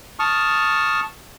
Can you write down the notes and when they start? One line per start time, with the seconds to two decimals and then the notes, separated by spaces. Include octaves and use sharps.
0.19 A5 C#6 D#6 F6